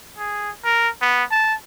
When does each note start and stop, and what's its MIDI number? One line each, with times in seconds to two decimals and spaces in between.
0.18 0.50 68
0.65 0.89 70
1.02 1.24 59
1.32 1.54 81